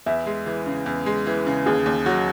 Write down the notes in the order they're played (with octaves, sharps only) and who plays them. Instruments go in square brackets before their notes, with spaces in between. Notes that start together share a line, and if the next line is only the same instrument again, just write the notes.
[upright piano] E2 [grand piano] E5
[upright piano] G#3
E3
C#3
E2
G#3
E3
C#3
[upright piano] D#2 [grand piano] G#4
[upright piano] D#2
[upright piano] F#3 [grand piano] F#4